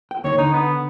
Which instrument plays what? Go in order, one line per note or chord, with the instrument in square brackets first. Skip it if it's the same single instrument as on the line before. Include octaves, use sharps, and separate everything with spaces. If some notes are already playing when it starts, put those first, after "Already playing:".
[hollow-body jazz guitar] G5
[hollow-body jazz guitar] D#2 D#3 [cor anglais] C#5
[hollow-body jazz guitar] D3 [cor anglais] D#4
[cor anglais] B3